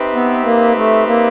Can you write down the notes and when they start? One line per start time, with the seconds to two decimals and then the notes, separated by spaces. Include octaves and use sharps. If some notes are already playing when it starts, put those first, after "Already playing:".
Already playing: C4 D#4 G4 B4 E5
0.15 B3
0.45 A#3
0.76 A3
1.08 A#3